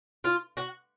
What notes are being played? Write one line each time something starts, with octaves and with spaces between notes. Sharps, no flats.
F4
F#4